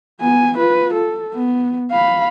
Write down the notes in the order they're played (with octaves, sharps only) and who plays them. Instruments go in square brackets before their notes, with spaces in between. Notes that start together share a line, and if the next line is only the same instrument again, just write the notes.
[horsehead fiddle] B3 G#5
F4 B4
A4
B3
F5 B5